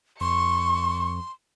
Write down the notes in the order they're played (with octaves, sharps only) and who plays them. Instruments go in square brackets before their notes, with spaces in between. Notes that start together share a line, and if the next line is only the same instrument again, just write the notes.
[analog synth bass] F2 [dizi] C6 [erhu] C#6